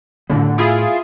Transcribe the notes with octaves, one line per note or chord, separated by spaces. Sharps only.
A2 D3 A3 B3
E4 F4 G#4